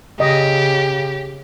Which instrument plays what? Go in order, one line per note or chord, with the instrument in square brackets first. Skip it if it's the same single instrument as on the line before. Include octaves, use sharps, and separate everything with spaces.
[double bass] C#3 [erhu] G4 [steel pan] D#5